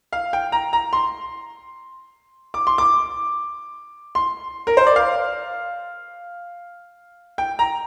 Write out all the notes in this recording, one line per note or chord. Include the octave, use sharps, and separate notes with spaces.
F5
G5
A#5
A#5
C6
D6
C6
D6
C6
A#4
C5
D5
F5
G5
A#5